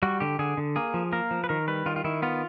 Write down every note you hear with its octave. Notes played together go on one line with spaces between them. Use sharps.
G3 F#4
D3 G4
D3 G#4
D3
A#3 G#4
F3
A#3 A#4
F3
B4
D#3 A#4
G3 B4
D#3 F4
F4
D#3 E4
B3 F4